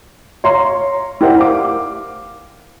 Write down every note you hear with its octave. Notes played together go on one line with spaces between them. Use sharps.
C#5 F5 A#5 C6
E4 G4 A#4 C5 D5 F#5
F5 D6